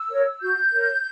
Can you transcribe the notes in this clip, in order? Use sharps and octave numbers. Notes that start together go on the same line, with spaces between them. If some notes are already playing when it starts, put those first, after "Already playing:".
Already playing: E6
A#4 C#5
F#4 G6
A#4 C#5